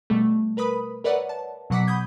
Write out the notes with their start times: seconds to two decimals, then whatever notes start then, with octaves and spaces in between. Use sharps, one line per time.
0.10 B2 G3 A3
0.57 A#4 B4 B5 D#6
1.04 A#4 B4 C#5 D5 E5 F#5
1.29 A5
1.70 B2 F#3 F#5 D6 B6
1.87 B5 D#6 G6 G#6